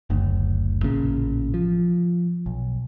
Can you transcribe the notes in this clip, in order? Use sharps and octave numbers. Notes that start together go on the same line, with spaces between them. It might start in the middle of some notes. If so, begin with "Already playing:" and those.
F#1 D2
A1 A#2 C#3
F3
B1